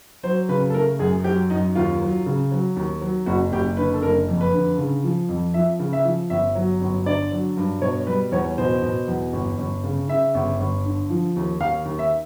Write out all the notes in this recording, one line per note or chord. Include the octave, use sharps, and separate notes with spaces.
F#3 C5
C#3 B4
A4
A3 A#4
F#2 G#4
F#3 G4
F#2 D#4
D#2 F4
F#3
C#3
F#3
D#2
F#3
F#1 F#4
F#1 G4
D3 B4
A4
F#1 A#4
F2
B4
D3
C#3
F3
F2
F3 E5
C#3
E5
F3
G1 E5
F#3
G1
D3 D5
F#3
G2
B2 C#5
G3 B4
E2 C#5
B2 C5
B2
E2
G1
G1
C#3
C#3 E5
G1
G1
D3
F3
D#2
D#2 F5
D#2
E5